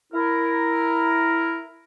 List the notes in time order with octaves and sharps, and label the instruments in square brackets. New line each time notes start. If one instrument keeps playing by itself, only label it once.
[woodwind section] E4 A#4